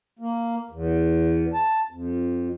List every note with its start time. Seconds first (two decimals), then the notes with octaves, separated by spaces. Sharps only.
0.19 A#3
0.70 E2
1.54 A5
1.91 F2